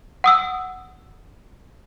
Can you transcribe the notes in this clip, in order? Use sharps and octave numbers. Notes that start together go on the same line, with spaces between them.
F#5 D#6 E6